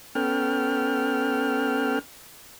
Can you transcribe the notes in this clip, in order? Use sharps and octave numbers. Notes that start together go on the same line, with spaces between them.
B3 C#4 A4 G5 F6